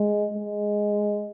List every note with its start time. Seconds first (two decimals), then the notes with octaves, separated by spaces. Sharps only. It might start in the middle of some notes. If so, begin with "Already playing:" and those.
Already playing: G#3
0.34 G#3